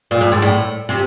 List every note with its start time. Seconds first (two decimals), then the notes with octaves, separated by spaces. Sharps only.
0.11 A#2
0.21 A2
0.32 G#2
0.42 A2
0.89 C3